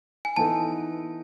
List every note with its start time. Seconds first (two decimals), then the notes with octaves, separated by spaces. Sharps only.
0.25 G#5
0.36 E3 B3 D#4 A4 A5